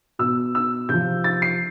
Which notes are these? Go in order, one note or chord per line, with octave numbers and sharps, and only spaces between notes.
B2 E6
E6
C3 F3 G6
A6
C7